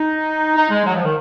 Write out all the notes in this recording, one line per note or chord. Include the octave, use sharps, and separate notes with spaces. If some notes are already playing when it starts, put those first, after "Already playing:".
Already playing: D#4
D#4
G#3
F#3
F3
D#3